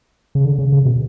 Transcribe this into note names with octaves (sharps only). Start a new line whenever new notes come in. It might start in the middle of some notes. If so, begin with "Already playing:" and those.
C#3
D3
C#3
C#3
B2